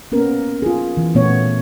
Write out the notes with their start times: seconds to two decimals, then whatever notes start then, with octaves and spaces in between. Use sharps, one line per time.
0.12 A#3 B3 C#4 A#4
0.62 F4 G#4
0.97 E3
1.15 A#2 A3 B3 C#5